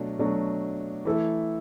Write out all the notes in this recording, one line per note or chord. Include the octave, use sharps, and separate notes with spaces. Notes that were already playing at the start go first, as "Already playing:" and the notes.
Already playing: B2 F#3 A3 D4
B2 F#3 A3 D4
E3 A3 E4 A4